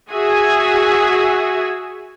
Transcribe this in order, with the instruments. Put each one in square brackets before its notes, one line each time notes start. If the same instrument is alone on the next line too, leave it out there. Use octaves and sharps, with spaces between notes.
[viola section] F#4 G#4 E5 G#5